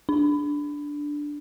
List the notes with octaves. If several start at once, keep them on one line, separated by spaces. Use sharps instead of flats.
D4